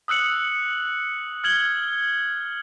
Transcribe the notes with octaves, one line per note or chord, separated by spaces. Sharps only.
D#6 E6 F#6 C#7 F#7
F6 G#6 F#7 G7